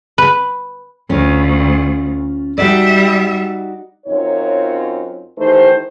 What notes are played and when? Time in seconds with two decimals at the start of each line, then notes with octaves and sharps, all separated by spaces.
0.18 B4
1.10 D2 C#4 F4
2.58 G3 D#4 F#4 D5 E5
4.07 F#2 C4 D#4 F4 C#5
5.38 D#3 E3 A3 D#4 G4 C5